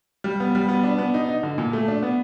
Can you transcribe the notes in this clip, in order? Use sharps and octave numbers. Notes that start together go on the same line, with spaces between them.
G3
B3
G3
B3
D4
B3
D#4
D#4
D3
A#2
A3
D4
B3